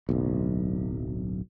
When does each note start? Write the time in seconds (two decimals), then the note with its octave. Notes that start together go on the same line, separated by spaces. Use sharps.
0.09 D1 B1